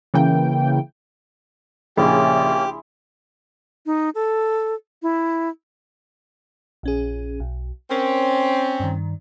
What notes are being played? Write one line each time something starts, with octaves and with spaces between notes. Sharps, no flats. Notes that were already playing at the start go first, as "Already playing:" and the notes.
C#3 E3 A#3 G5
A#1 C#3 A#3 C#4 E4 G4 G#4 C6
D#4
A4
E4
A#1 C#4 G#4
B1
C4 C#4 A#4
G2 D#3